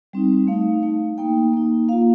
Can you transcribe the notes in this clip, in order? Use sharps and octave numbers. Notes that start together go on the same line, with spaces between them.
G3 C4 D#4
A3 D#4 F5
A3 D#4
A#3 D#4 G5
A#3 D#4
A#3 F4 F5